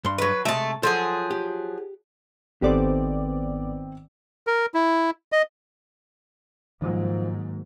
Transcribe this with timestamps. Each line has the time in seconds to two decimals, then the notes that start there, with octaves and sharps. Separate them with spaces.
0.05 G2 C6
0.18 F#3 B4
0.45 C3 G#3 A3 E5 A5
0.83 F3 F#3 G#4 A4
1.31 G4
2.62 G#1 D#3 B3 C4 G4 A4 C5 D5
4.47 A#4
4.74 E4
5.32 D#5
6.82 G#2 D#3 F3 F#3 A#3